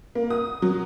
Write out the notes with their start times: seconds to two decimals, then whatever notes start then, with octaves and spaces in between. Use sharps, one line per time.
0.15 A#3
0.30 D#6
0.62 F#3